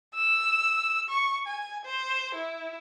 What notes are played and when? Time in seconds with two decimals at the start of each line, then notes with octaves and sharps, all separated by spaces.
0.14 E6
1.09 C#6
1.47 G#5
1.85 C5
2.35 E4